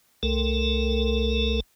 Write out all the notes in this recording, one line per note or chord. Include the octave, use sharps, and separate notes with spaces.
C2 A3 A4 A#4